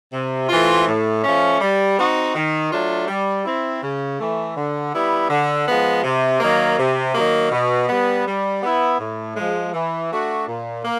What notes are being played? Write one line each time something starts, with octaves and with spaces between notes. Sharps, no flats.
C3
E3 A3 C4 F4
A2
F3 A3 C#4
G3
C4 D#4 F#4
D#3
F#3 A3 D4 F4
G3
C4 E4
C#3
E3 A3
D3
G3 B3 E4
D3
F3 G#3 B3
C3
D#3 F#3 A#3
C3
D#3 F#3 A#3
B2
G3 B3
G3
B3 E4
A2
F3 G#3
E3
A3 D4 F#4
A#2
A#3